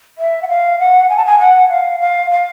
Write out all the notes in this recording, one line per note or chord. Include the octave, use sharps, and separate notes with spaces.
E5
F#5
F5
F#5
G#5
A5
G#5
F#5
F5
F5
F5